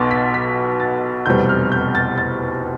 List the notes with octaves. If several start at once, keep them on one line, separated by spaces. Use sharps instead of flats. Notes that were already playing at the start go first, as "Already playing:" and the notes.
Already playing: B1 B2 B3 C6 D6 A6
B6
B6
A6
F1 E2 B2 G3 C4 G6
F6
G6
A6
A6